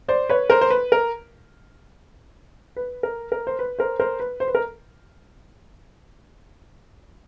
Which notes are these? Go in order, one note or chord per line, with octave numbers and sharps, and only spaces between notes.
C5 D5
B4 C#5
A#4 C5
C5
B4
A#4
B4
A#4
A#4
C5
B4
A#4 C5
A#4 C5
B4
C5
B4
A#4